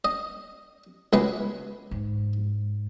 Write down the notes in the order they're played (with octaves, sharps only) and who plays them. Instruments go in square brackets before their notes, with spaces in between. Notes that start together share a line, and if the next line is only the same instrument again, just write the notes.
[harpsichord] D#5
C#2 G#3 B4
[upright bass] G#2